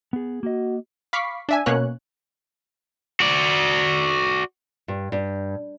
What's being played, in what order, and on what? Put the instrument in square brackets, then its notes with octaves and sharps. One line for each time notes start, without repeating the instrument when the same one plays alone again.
[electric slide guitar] B3 G#4
[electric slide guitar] A#3 D#5 [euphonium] F#4
[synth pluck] F5 B5 C#6 D6 B6 C7
D4 E5 G#5
B2 A#3 C#4 C#5 F#6
[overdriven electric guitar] F#4 D5
[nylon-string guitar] G2
G2